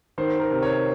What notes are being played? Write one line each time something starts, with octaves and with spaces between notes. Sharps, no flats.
D#3 C5
A#4
C3
C#5